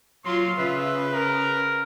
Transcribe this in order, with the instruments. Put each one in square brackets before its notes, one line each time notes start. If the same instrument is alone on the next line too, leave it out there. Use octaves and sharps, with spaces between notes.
[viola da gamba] F#3 F4 [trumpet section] C6
[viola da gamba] C#3 [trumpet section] F4 E5 [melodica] B4
[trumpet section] A#4